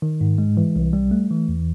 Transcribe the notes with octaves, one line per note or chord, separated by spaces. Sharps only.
D#3
G#2
G#3
E3
C2
G3
A3
E3
E2